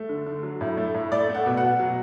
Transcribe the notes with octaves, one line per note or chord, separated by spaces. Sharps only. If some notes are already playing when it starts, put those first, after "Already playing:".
Already playing: A3
D3
D3
F#3
A2
A3
A2
A3 D5
A3
F#5
B2
F#5
B2
F#3